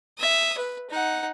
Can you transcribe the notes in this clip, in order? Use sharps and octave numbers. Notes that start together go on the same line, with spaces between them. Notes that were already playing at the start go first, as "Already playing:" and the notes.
E5 D#6
B4
D#4 F#5